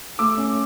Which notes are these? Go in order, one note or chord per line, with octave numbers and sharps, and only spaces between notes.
A3 D6 E6
C#4